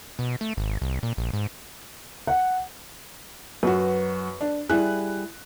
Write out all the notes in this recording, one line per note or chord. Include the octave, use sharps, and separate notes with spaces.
B2
A3
G#1
C2
A#2
A#1
G#2
F#5
F#2 F#4 B4
D4
G3 E4 G#4 F#6